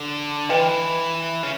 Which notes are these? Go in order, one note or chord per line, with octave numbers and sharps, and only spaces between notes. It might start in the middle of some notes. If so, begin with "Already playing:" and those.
Already playing: D3
E3 B4 D#5 G5 C6
C#3